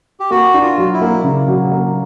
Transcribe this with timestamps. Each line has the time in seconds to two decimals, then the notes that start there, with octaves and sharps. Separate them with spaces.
0.20 G4
0.30 A#3 F#4
0.54 D4
0.61 F4
0.78 F#3
0.93 E4
1.01 A#3
1.24 C#3
1.48 F#3
1.72 A#3